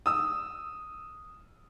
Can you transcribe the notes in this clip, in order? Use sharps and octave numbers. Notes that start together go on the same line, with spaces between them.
D#6 E6